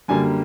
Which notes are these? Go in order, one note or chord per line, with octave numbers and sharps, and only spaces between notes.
F#2 D3 G3 A#3 G#5